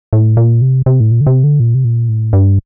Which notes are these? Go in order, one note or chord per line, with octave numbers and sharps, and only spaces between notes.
A2
A#2
C3
C3
A2
A#2
D3
C3
D3
A#2
C3
A#2
A2
G2